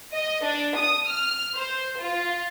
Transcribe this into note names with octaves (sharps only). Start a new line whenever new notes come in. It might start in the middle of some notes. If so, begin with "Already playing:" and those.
D#5
D4
D#6
F6
C5
F4